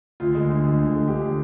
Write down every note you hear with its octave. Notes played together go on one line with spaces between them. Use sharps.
D2 F4
D3 G#3
D2
D3 G#3
D2
D3 G#3
D2 G4
D3 G#3